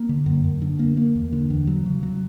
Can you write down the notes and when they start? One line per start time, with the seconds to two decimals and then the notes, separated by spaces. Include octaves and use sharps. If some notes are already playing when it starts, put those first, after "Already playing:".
Already playing: A#3
0.09 D3
0.26 F#2
0.44 F#2
0.62 D3
0.79 A#3
0.97 A#3
1.15 E2
1.32 D3
1.50 E2
1.67 F#3
1.86 C#3
2.03 F#3